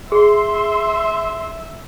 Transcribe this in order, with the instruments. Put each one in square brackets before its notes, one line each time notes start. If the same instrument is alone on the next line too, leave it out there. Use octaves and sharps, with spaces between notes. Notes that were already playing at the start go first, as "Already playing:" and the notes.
[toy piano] G#4 [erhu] E5 [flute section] C6